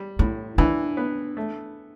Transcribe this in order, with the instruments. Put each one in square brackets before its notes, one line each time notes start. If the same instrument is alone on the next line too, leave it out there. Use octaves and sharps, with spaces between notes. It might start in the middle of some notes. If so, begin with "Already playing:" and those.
Already playing: [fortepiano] G3
[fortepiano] A2 [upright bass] E4
[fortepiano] E3 [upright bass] D4
[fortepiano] B3
A3